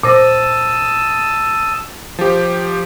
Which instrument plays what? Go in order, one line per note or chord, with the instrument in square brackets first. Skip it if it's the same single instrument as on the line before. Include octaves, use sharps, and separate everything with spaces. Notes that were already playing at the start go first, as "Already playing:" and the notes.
[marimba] A#2 C5 A#6 [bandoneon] A5 D#6 E6
[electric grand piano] F3 G4